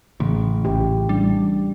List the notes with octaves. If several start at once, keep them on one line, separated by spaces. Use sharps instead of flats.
A1 C#3
A#1 G4
G3 D4